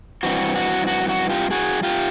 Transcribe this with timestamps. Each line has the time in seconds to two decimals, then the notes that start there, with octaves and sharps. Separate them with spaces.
0.23 G2 E3 C4 F#4
0.56 F#4
0.87 F#4
1.09 F#4
1.30 F4 G4
1.51 F#4 G#4
1.83 F4 G4